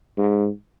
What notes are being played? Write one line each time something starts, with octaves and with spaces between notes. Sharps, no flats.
G#2